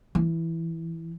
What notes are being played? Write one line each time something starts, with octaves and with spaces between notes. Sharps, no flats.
E3